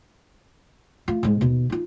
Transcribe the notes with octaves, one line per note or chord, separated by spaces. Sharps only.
A3 F4
G#2 G#3
D#2 B2
D#4 F4